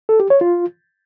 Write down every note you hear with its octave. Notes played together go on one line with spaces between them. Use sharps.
A4
G4
C#5
F4